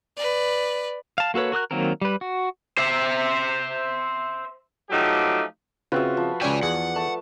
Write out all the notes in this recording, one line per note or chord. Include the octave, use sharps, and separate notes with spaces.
B4 D5
F5 A5
A#3 F#4 A4 B4 C#5
F#4 A#4 D#6 F#6
D#3 F#3 A#3 C4 A#4
G3 B4
F#4
C5 E5
F3 F#3 A3 D#4 G4
C#3 C4 F4 F#4 B4 E5
F3
C#2 C#4 E4 D5 G5 G#5
E2 G#4 F#5
A3 A5